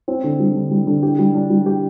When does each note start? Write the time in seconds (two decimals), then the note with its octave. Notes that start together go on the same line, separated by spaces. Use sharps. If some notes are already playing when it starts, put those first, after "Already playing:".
0.08 C4
0.24 D3
0.40 G3
0.55 D3
0.71 G3
0.87 D3
1.03 G4
1.19 G3
1.34 D4
1.50 G3
1.66 G4